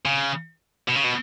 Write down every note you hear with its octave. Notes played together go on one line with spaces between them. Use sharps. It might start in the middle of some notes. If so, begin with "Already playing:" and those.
C#3
B2
C#3
B2